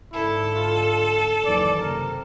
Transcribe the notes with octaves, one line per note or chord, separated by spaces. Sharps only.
G#2 D3 E4 A4
F4
F#1 D#2 E3 D5
C3 A#4